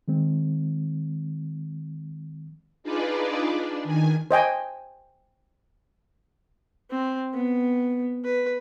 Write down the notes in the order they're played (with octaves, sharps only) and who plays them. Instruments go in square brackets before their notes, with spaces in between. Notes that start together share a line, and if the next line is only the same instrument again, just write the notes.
[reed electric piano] D#3 G#3 C4
[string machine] D4 D#4 F4 G#4 B4 D5
D4
D#3 G#5
[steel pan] C5 D#5 G5 G#5
[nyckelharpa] C4
B3
B4